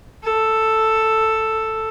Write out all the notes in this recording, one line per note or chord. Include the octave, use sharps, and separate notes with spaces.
A4